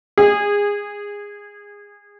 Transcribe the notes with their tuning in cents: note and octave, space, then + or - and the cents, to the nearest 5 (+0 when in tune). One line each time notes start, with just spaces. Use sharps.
G#4 -20